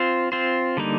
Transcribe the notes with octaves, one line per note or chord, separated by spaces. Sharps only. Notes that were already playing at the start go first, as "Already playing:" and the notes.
Already playing: C4 F4 C5
C4 F4 C5
D3 G3 A#3 D#4